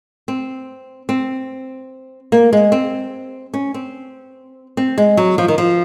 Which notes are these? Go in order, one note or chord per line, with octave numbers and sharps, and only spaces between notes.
C4
C4
A#3
G#3
C4
C#4
C4
C4
G#3
F#3
F3
D#3
F3